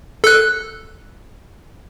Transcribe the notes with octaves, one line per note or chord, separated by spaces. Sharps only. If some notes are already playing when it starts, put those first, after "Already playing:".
A4 F#6